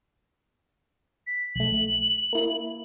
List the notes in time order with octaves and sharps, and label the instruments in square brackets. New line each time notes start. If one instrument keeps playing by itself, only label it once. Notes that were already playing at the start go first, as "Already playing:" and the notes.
[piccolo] B6
[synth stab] B1 A3 [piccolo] F#7
[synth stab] A#3 E4